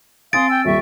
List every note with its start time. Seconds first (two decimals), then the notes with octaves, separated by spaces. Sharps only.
0.33 C4 F5 G#5 C6 D#6 A6 D7
0.49 G5 E6
0.65 D#1 G3 E5 C#6